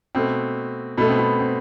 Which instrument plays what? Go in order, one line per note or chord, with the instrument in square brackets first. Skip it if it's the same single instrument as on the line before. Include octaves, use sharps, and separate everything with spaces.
[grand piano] B2 A3 C4
B2 A3 B3
C4
B3
C4